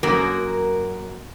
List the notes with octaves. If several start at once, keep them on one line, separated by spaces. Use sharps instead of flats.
F#2 A#3 F#4 A#4